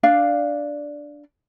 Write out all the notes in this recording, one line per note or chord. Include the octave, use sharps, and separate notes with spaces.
D4 D5 F5